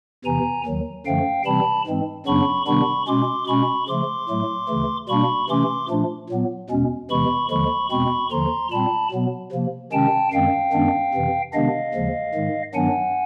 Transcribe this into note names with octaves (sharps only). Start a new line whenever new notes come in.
E2 C3 E3 G#5 A#5
D#2 D#3 F#3
F#2 D3 F3 A3 F5 G5
C3 E3 G3 C4 A5 B5
G#2 E3 G#3 C4
F#2 C#3 F#3 B3 D4 B5 C#6
C3 D#3 G3 B3 D4 B5 C#6
B2 G#3 C#4 C6 D6
B2 G#3 C#4 B5 C#6
C#3 F3 A3 C6 D6
A2 F#3 A3
D2 C#3 E3 A3
B2 G3 A#3 D4 B5 C#6
C3 E3 A3 C#4 C6 D6
A#2 F3 A3 D4
A#2 F#3 B3
E2 B2 G#3 C#4
E2 C3 E3 G#3 B5 C#6
D#2 D3 F3 G#3 B5 C#6
E2 B2 G#3 C4 B5 C#6
D#2 D3 F3 A#5 C6
A#2 G3 C4 A5 B5
B2 F#3 B3
C3 F3 A#3
C3 D#3 G#3 C#4 G5 A5
F#2 D#3 G#3 C4 F5 G5
F#2 D#3 G#3 B3 D4
F2 C3 E3
C3 D#3 G#3 B3 D4 D#5 F5
D#2 C#3 F3 G#3
G#2 D#3 G#3
G2 D#3 F#3 B3 D4 F#5 G#5